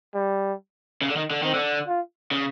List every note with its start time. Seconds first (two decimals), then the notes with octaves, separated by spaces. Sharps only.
0.14 G3
1.02 C#3
1.10 D3
1.16 D#3
1.30 D3
1.43 D#3 C4
1.54 D3
1.88 F4
2.31 C#3